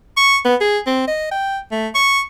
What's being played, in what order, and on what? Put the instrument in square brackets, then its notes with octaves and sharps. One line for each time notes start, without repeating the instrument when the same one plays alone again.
[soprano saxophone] C#6
B3
G#4
C4
D#5
G5
A3
C#6